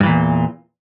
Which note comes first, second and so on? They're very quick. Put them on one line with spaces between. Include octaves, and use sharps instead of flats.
G2 E3 A#2 E2